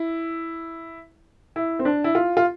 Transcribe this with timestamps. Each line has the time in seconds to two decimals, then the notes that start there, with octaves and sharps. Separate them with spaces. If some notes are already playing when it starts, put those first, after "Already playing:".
Already playing: E4
1.56 E4
1.79 C4
1.85 D4
2.04 E4
2.15 F4
2.37 F4